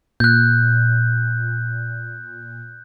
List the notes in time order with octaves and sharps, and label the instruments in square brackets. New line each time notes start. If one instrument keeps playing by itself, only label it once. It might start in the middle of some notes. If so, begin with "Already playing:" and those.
[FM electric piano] A#2 [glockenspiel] F#6 G6